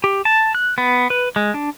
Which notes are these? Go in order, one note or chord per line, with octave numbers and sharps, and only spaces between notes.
G4
A5
F#6
B3
B4
G#3
D4